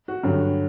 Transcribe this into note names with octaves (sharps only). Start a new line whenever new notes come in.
F#4
G2 D3 F#3